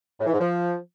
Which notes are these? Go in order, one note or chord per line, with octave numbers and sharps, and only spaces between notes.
A2
E3
G#2
F3